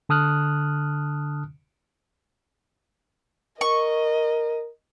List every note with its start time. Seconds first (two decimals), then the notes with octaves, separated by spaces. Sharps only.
0.09 D3 A5 D#6 F6 F#6
3.61 A#4 D#5 C#6